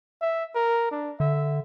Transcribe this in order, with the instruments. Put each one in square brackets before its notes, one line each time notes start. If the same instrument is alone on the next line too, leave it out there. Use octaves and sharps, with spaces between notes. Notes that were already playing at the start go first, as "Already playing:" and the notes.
[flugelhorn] E5
A#4
D4
[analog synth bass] D3 [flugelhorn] E5